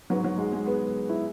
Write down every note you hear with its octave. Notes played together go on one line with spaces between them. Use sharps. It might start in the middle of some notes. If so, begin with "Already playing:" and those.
G#2 F#3 B3
F#3
G#3
G#3
B3
E4